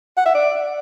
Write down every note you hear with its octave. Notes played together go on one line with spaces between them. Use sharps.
F#5
E5
D5